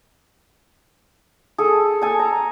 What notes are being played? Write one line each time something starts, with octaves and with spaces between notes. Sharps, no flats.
G#4 A4
A4 G#5 A5
A#5